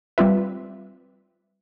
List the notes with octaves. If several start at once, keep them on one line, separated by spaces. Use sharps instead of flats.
G3 C4 F4 B4 E5